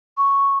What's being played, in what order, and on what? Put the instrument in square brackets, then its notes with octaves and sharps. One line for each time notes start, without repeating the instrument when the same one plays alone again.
[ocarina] C#6